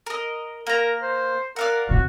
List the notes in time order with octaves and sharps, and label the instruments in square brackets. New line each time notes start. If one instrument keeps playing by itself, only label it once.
[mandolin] A#4 D#5
[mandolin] A#3 A#5 [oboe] A#4
[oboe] C5
[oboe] A#4 [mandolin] D5 F5 F#5
[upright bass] E2 C3 [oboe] F#4